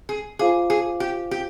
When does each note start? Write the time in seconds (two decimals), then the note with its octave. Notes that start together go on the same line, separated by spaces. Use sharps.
0.09 G#4
0.39 F4 G#4 C5 F5 G#5 D6
0.70 G#4
1.00 G4
1.31 G4